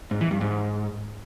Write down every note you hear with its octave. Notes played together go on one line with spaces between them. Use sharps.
G#2
E3
G2
G#2